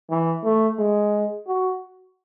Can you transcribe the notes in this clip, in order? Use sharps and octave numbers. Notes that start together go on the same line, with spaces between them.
E3
A3
G#3
F#4